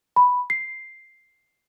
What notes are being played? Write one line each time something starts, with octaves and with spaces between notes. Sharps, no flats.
B5
C7